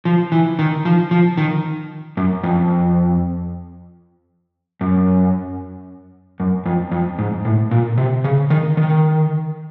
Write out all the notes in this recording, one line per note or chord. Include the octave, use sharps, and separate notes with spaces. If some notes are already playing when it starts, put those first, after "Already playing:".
F3
E3
D#3
F3
F3
D#3
F#2
F2
F#2
F#2
F2
F2
G#2
A2
A#2
C3
C#3
D#3
D#3